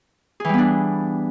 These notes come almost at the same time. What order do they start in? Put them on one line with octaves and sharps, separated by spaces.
G#4 E3 G3 B3 D4